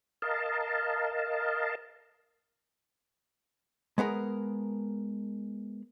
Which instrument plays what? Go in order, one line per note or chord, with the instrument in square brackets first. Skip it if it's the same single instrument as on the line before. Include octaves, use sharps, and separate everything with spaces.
[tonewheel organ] A#4 D#5 F5 A5
[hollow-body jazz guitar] G#3 B3 G#4 A#4